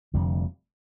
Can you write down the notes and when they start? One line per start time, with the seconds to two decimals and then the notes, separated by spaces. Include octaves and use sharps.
0.14 F1 F2 D3 G3